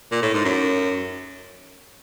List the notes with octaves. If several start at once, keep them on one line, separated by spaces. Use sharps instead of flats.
A#2
A2
G#2
F#2